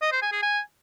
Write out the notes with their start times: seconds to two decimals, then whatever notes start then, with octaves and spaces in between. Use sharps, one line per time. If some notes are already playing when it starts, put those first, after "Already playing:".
0.02 D#5
0.12 C5
0.22 G#5
0.32 G#4
0.42 G#5